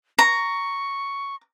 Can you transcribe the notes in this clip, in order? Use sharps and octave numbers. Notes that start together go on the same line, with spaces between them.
A#5 C#6